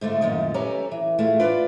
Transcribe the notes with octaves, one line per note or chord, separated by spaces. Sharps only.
G#2 D3 A3 F4
F#2 A#2 D#3 F3
C#4 G4 A4 B4 G#5 A#5
E3
A2 E3 G#3 A3 F4
D4 F4 B4 D5